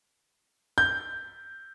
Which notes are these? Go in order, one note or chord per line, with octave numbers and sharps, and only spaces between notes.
G6